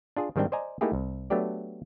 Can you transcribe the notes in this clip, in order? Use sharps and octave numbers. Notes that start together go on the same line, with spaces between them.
D4 F4 G#4
G#2 D#3 G3 C4 D4 G5
C5 D5 D#5 G#5 A#5
A3 A#3 D#4 E4 G4 G#4
C2
F#3 A3 B3 D4 G4 D5